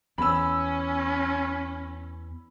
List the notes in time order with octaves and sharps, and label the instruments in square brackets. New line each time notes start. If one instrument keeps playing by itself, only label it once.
[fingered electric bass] E2 [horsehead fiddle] C#4 [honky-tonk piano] B5 E6